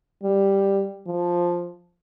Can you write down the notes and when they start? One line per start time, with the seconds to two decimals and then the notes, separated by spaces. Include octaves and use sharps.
0.23 G3
1.07 F3